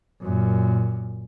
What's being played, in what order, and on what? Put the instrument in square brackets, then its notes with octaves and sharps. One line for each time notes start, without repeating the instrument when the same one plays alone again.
[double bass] F#2 A#2